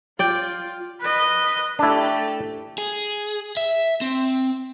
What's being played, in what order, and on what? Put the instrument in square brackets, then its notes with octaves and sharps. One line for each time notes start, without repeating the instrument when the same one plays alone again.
[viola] F4 [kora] D5 G5
[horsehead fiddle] B4 D#5
[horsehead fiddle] A3 G4 [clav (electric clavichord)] D4 E4
[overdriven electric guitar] G#4
E5
C4